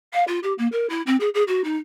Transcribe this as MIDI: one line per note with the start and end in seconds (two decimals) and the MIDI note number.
0.13 0.24 77
0.27 0.39 65
0.43 0.53 67
0.58 0.67 58
0.72 0.86 70
0.89 1.01 64
1.06 1.16 60
1.20 1.29 68
1.34 1.43 68
1.47 1.61 66
1.64 1.76 63